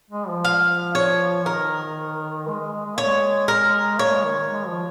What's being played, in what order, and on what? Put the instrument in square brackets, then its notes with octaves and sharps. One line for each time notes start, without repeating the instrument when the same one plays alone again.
[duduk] G#3
F3
[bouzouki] F5
C#5
[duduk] D#3 [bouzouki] A#4
[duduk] G#3
G#3
G#3
G#3
[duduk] A#3 [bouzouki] C#5
[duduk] G#3
[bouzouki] A#4
[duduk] A#3 [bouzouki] C#5
[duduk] G#3
D#3
G#3
F3